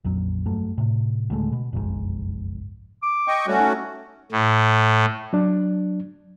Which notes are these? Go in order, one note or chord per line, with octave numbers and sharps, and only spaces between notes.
A#1 F2 F#3
G2 F#3 A3
A2 C3
D2 A2 G#3 A3
B2
F#1 B1 F2 G#2
D6
D#5 G5 C#6
G3 A3 C#4 F#4
D#4
A2
F#3 D4